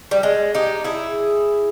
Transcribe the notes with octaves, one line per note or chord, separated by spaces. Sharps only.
G3
G#3
D#4 G4
E4 G#4